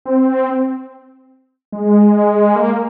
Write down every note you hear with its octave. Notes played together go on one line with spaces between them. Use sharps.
C4
G#3
A#3